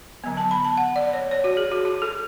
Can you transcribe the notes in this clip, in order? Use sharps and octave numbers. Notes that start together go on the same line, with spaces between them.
D3 F#3 B3
A5
B5
A5
F#5
D5
C#5
C#5
F#4
G#4
F#4
F#4
A4